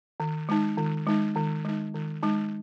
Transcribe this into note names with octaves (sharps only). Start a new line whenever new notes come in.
D#3
G#3 D#4
D#3
G#3 D#4
D#3
G#3 D#4
D#3
G#3 D#4